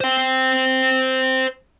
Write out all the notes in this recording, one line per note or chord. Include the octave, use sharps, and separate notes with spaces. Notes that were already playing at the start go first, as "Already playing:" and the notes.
C5 G5